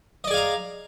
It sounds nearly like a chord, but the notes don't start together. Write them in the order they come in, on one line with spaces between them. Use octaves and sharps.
D#5 D5 G#4 F5 A#5